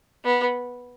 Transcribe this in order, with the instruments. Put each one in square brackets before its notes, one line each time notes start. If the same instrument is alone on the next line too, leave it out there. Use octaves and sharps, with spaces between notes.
[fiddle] B3